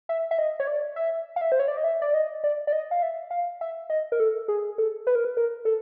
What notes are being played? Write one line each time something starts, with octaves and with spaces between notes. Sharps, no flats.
E5
E5
D#5
C#5
D5
E5
F5
E5
C5
C#5
D5
D#5
E5
D5
D#5
D5
D5
D#5
F5
E5
F5
E5
D#5
A#4
A4
G#4
A4
B4
A#4
B4
A#4
A4